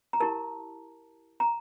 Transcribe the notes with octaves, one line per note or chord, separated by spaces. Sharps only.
A#5
E4 G4 A#4 A5
A#5